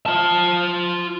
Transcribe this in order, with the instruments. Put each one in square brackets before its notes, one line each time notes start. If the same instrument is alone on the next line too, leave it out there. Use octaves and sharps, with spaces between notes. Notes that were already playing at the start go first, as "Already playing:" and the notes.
[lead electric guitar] F4 A5